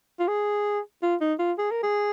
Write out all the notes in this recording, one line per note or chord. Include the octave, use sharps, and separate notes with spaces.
F4
G#4
F4
D#4
F4
G#4
A#4
G#4